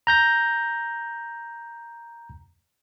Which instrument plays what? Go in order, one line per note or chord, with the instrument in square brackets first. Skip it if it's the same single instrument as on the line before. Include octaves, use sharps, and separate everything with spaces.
[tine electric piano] A#5 G6 A#6